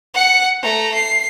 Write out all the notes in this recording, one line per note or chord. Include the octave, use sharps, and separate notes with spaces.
F#5 C#7
A3 A#5
C7